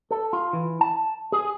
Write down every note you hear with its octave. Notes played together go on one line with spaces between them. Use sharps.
A4
F4
E3
A5
G#4